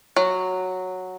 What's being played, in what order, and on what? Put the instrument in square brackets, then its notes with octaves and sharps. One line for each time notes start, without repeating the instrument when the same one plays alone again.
[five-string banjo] F#3